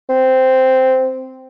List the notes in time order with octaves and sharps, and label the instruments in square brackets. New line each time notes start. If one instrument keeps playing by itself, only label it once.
[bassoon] C4